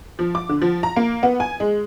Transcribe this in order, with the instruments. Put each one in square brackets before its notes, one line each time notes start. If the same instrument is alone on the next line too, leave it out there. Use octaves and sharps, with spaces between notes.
[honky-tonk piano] F3
D6
D3
F3
A#5
A#3
B3
G#5
G#3